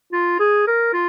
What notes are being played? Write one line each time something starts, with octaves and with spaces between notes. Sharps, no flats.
F4
G#4
A#4
F4